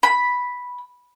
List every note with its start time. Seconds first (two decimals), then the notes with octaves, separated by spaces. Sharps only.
0.03 B5